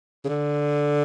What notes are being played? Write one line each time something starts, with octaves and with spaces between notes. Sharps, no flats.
C#3
D3